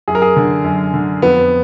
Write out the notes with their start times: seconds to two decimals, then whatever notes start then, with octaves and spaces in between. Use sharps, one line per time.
0.08 F#2 G#4
0.15 A#4
0.22 G#4
0.36 D3
0.64 F#2
0.94 D3
1.22 F2 B3